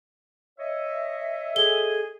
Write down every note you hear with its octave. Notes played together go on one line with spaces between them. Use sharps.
C#5 D#5 E5
G#4 A4 G7